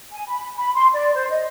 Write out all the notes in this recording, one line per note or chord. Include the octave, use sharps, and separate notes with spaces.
G#5
B5
B5
C6
D5
C5
D#5